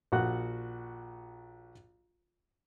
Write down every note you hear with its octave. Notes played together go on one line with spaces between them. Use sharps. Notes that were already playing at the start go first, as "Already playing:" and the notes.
A#1 F#4 F#5 F#6